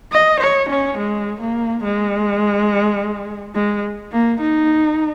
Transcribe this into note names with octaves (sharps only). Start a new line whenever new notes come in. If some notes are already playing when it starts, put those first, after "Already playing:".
D#5
C#5
C#4
G#3
A#3
G#3
G#3
A#3
D#4